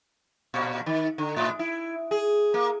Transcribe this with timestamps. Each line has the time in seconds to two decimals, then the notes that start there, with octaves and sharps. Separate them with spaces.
0.54 A#2
0.86 D#3
1.18 D3
1.36 A2
1.59 E4
2.11 G#4
2.54 A#3